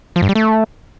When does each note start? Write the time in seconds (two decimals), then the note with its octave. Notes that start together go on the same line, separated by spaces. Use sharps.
0.16 F3
0.22 G2
0.29 G3
0.35 A3